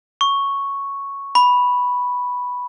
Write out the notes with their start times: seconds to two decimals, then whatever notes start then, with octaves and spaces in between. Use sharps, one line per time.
0.21 C#6
1.35 B5